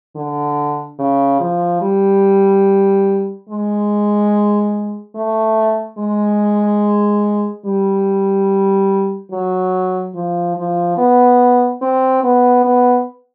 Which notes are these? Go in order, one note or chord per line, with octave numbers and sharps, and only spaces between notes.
D3
C#3
F3
G3
G#3
A3
G#3
G3
F#3
F3
F3
B3
C4
B3
B3